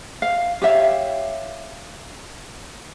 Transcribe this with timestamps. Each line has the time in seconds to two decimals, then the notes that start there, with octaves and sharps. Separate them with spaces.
0.22 F5
0.62 G4 C#5 E5 F5